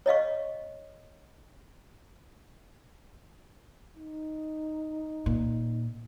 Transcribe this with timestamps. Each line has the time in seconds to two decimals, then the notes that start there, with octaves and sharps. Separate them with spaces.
0.06 C#5 D#5 F5 C#6
3.97 D#4
5.26 A#2